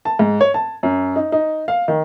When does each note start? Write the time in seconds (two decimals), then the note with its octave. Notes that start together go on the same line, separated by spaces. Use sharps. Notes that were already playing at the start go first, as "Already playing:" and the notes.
0.05 A5
0.19 G#2
0.41 C#5
0.54 A5
0.83 F#2
1.16 D#4
1.32 D#4
1.68 F5
1.88 D#3